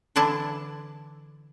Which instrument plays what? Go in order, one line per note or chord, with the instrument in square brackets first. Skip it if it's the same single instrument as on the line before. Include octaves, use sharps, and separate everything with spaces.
[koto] D3 E3 D4 E4 A5